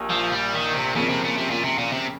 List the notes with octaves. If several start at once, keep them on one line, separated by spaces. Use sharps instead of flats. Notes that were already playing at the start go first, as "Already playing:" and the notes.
Already playing: A#1 A#2 G4
F3
G3
D#3
C3
F2 A#2 C#3 F3 A#3 C#4
C3
A#2
C3
A#2
C3
A#2
C3